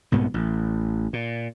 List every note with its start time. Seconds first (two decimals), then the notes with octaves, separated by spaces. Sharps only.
0.12 C2 G#2 B2 B3
0.34 A1
1.13 A#2